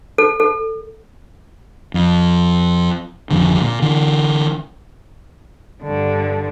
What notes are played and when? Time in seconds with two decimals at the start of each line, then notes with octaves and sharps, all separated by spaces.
0.18 A4
0.40 A4
1.94 F2
3.31 G#1 F2 D3
3.62 A#2
3.82 D3 E3
5.83 G2 D3